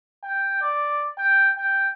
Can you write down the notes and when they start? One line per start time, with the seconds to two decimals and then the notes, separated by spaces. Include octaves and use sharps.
0.24 G5
0.62 D5
1.18 G5
1.58 G5